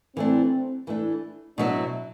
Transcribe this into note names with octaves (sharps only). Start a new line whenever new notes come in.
E3 A3 C4 D4
E3 A3 D4
B2 F#3 B3 D4 E4